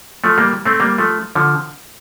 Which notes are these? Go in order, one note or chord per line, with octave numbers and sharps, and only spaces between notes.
F3 A3
G3 A#3
A3 C4
G3 A#3
F3 A3
D3 F3